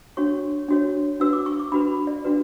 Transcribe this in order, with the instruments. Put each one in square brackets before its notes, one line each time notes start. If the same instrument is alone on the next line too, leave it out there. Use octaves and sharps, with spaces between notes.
[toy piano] D4 F#4 C#5 C#6
D4 F#4 C#5
D4 F#4 B4 E6
D6
C#6
D6
D4 F#4 B4 B5
D5
D4 F#4 B4